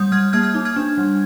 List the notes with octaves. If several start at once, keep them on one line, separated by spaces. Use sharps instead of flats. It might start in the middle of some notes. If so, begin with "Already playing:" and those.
Already playing: G3 D#6 G6
G3 F6 G#6
A#3 F6 G#6
F6 G#6
D#4
F6 G#6
D4
G3